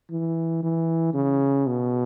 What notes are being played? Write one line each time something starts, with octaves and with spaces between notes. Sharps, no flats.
E3
E3
C#3
B2